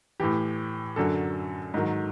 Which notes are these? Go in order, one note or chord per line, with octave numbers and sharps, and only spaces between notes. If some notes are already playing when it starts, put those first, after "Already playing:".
A2 E3 G4
F#2 D3 F#3 A4
G#2 D#3 F#3